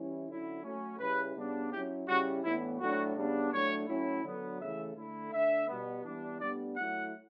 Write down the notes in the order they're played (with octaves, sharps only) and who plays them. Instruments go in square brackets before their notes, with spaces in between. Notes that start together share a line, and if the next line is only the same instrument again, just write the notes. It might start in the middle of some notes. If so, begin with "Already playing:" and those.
Already playing: [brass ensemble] E3 G3 C#4 E4
D3 F#3 C#4 E4
F#3 A3 C#4
C#3 G3 C#4 E4 B4
C#3 G3 B3 D4
F#3 C#4 E4 G4
C#3 G3 C#4 E4 F#4
A2 E3 B3 D4 E4
A2 F#3 A3 D4 F#4
C#3 G3 B3 D4
A2 F#3 A3 D4 C#5
A2 F#3 C#4 E4
D3 F#3 B3
C#3 E3 A3 E5
D3 A3 E4
D3 A3 D4 E5
B2 G3 B3
E3 G3 B3 D4
A2 G3 B3 D4 D5
F#3 A3 E4 F#5